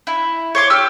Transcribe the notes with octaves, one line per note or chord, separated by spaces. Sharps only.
E4
C#5 C6 D6
G4 E6 F6